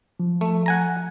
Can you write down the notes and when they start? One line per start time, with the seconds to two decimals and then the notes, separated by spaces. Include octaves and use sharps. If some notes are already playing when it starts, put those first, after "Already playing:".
0.20 F3
0.41 A3
0.66 F#5 G#5 A#5